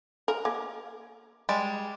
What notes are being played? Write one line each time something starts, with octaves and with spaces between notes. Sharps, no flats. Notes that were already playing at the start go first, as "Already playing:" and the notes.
A#4
A#3
G3 G#3 D5